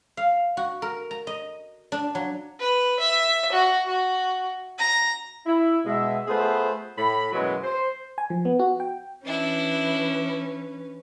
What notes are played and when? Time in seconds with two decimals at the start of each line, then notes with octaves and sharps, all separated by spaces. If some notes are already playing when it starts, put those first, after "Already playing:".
0.17 F5
0.57 F#4
0.82 A#4
1.11 A#5
1.27 D#5
1.92 D4
2.15 F#3
2.59 B4
3.00 E5
3.52 F#4
3.88 F#4
4.79 A#5
5.46 E4
5.85 B2 G#3 E5
6.28 A3 B3 F4 G#4 B4 C5
6.98 A2 B5
7.33 F#2 B2 E3 F#3 G#3
7.64 C5
8.18 G#5
8.30 F3
8.45 B3
8.59 F#4
8.80 G5
9.25 E3 C#4 D4 E4 B4